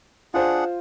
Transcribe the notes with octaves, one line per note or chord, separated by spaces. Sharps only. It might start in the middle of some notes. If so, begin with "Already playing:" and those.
D4 F4 G#4 C5 F#5